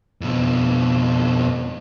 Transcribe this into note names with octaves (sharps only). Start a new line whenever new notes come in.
F2 B2